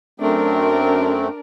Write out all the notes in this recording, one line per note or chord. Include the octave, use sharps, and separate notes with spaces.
F#2 A3 C4 D4 A#4